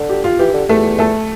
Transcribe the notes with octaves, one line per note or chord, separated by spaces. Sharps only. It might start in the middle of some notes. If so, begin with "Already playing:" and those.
Already playing: D3
G4
F4
E3 G4
D3
E2 A3 A4
A3 A4